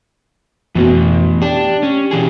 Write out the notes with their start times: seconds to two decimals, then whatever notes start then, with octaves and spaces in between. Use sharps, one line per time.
0.75 F2 B2 E3 A3
1.42 D4 G4
1.83 C#4
2.11 B2 E3 G#4